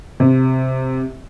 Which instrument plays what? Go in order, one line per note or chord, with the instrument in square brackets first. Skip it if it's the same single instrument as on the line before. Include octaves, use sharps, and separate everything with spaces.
[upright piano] C3